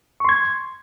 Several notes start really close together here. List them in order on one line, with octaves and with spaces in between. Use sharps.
C#6 C6 G#6